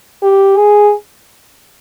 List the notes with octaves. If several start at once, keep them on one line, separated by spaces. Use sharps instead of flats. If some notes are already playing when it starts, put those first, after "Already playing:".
G4
G#4